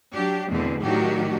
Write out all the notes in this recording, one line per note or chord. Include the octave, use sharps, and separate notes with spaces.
F#3 D4 G4
E2 B2 D3 E3 A3 C4
A2 D#3 F#3 D4 F#4 G4